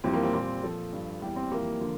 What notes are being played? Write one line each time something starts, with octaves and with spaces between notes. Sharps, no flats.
F2 E3 G3 C4
A#3
C4
A#2 G3
A#2 F3 A4
G2 F3
E2 E3 G3 G4
C4
F2 E3 G3 A#3
D3 F3